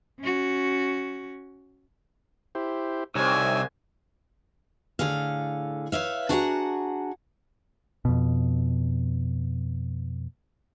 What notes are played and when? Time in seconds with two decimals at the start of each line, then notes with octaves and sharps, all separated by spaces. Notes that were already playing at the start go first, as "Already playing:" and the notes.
0.20 C#4 F#4
2.55 E4 G4 C5
3.15 C2 C4 D#4 C#5 G#5 E6
4.99 A2 D3 G#4 F5
5.92 B4 C#5 E5 F5
6.29 D4 F#4 G#4 D5 F#5 A#5
8.05 F2 B2